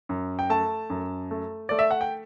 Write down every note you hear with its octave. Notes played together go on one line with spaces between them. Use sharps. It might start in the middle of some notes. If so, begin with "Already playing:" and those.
F#2
G5
A3 A5
F#2
A3
A3 D5
E5
F#5
G5